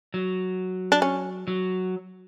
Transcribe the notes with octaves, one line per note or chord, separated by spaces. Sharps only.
F#3
D4
C#4
F#3